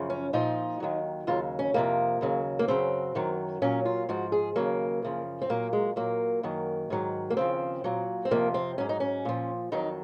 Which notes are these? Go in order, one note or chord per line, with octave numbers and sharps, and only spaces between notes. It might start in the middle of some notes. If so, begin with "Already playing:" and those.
Already playing: F#2 C#3 F3
C#4
A#2 F3 D#4
D#2 D#3 F#3
D#2 C#3 F#3 F4
C#4
F2 C3 F3 A#3
D#2 C#3 F#3
A#3
F#2 C#3 F#3 C4
F#2 D#3 F#3
A#2 F#3 C#4
F4
G#2 F3 F#4
G#4
D#2 C#3 F#3 A#3
F#2 C#3 F3
C4
A#2 F#3 A#3
G#3
A#2 F#3 A#3
F#2 D#3 F#3
G#2 D#3 F#3
A#3
D#2 C#3 F3 C4
A#2 F#3
C4
F2 C3 F3 A#3
C4
G#2 F#3 C#4
D#4
C#4
A#2 F3
F2 D#3 F#3 D#4